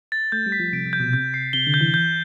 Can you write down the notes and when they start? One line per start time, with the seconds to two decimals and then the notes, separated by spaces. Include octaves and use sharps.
0.12 A6
0.32 A3 G6
0.46 G3
0.52 B6
0.60 F3
0.73 C3 D7
0.86 C3
0.93 G6
1.00 B2
1.13 C3 G6
1.34 C7
1.53 C3 G7
1.67 D3
1.74 G6
1.81 E3
1.94 G6